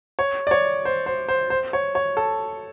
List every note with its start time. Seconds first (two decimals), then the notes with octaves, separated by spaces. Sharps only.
0.19 C#5
0.47 D5
0.51 C#5
0.85 C5
1.06 C5
1.28 C5
1.50 C5
1.73 C#5
1.95 C#5
2.17 A4